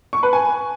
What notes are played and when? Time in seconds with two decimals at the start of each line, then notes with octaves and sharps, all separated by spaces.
0.13 C#6
0.23 B4
0.33 G#5